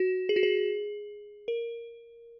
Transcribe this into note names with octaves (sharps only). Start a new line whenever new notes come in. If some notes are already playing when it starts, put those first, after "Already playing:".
Already playing: F#4
G#4
F#4
G#4
A#4